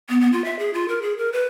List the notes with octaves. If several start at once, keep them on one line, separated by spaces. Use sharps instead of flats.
B3
B3
F4
E5
G#4
F4
A#4
G#4
A#4
B4